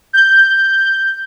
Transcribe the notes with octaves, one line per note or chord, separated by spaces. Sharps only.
G6